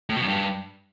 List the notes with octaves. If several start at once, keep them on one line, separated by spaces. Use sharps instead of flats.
A2
B2
F#2
G2